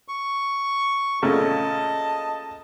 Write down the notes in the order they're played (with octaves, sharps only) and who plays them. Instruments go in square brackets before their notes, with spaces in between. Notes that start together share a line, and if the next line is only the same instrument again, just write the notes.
[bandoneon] C#6
[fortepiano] A#2 C#3 A3 [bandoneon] D#5 [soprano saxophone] A5